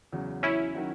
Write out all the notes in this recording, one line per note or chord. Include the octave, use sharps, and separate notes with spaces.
E2 C#3 F#3
C#4 E4
D#3 F#3 C#4 F#4